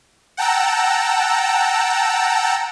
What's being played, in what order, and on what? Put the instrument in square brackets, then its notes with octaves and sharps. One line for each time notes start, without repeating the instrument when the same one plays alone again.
[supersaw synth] F#5 G5 A5 A#5 E6